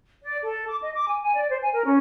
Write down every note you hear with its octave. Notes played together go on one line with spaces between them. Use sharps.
D5
A4
D6
D#5
D6
G#5
G#5
D5
C5
G#5
A#4
C#4